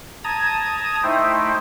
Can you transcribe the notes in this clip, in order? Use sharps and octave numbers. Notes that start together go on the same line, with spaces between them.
A5 A#5 D#6 G#6
A3 D#4 E4 C5 E5 G5